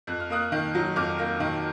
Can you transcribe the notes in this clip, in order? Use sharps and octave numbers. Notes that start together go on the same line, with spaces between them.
F2 F#6
F6
A#3 D#6 F#6
D#3
F#3
F2 D6 F6
A#3
D#3